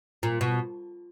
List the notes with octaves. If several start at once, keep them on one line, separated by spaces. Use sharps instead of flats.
A#2
B2